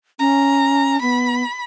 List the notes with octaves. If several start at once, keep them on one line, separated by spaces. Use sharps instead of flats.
C#4 A#5
B3 B5